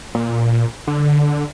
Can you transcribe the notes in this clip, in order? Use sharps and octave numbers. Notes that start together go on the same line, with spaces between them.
A#2
D3